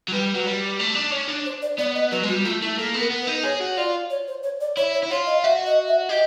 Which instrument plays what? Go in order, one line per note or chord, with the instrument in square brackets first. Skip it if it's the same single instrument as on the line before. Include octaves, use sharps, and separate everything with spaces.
[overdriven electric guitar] F#3
[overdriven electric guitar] G3 [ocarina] B4
[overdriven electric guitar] F#3
G3
A3
D4
C#4
D4
[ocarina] C5
D5
[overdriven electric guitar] B3 [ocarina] D5
[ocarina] D#5
[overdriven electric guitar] F#3 [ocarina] B4
[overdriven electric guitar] G#3
[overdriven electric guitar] G3 [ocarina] F#4
[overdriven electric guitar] A3 [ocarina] F4
[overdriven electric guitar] A3 [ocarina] E4
[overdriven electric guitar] A#3 [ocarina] A4
[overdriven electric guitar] B3
[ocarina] A#4
[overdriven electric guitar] B3
[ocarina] B4
[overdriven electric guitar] D#4
[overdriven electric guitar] G#4 [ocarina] C#5
[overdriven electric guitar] F#4
[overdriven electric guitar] F4 [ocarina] D5
[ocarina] C#5
C5
C#5
D5
[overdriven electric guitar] E4 [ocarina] C#5
[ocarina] C#5
[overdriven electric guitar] E4
[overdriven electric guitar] F4 [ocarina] C#5
[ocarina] D#5
[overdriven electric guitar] F#4 [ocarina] E5
[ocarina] D#5
E5
[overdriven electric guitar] G4 [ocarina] D#5